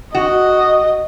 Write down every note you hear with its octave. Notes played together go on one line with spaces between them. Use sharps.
F#4 D#5